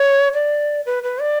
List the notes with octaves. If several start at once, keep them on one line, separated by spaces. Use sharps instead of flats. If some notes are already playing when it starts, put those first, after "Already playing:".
Already playing: C#5
D5
B4
B4
D5